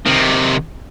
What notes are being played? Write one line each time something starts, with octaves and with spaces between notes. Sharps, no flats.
C3 D#3